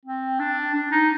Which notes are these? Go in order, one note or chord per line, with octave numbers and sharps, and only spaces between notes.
C4
D4
D4
D#4